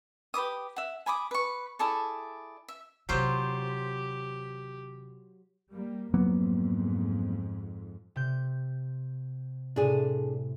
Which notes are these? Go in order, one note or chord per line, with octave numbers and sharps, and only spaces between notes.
G4 B4 D6 D#6
E5 F#5
G#5 B5 D6 D#6
B4 C#6
E4 G#4 A4 D5
E5
D#2 C3 F#3 F4 G4 C5
G3 A#3
F2 G#2 F#3 A#3 B3
C3 G6
A2 C3 D4 G#4